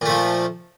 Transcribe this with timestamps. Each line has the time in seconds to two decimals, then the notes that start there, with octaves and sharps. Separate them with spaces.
0.02 A#2
0.05 A3
0.09 F3